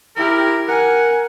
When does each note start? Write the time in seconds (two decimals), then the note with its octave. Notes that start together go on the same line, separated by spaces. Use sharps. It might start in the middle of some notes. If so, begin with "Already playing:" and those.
0.16 E4 G4 A#4
0.68 A#4 F#5 G#5